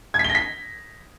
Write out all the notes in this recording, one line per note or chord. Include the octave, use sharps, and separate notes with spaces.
G#6
B6
G7
A#6
B6